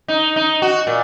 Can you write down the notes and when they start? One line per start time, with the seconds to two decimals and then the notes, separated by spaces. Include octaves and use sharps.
0.08 D#4
0.36 D#4
0.62 F#4
0.87 A#2